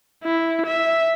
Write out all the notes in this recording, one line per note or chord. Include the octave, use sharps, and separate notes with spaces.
E4
E5